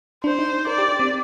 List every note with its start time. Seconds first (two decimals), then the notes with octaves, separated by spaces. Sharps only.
0.24 D4 C5
0.39 D#4
0.67 A#4 D5
0.78 G4
0.89 G4
1.00 C4